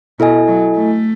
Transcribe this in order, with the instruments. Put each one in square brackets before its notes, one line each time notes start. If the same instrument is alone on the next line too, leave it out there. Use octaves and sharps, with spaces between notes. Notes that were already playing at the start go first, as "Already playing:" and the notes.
[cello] B2 [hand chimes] E4 A4 D#5 G#5
[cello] F#3
A3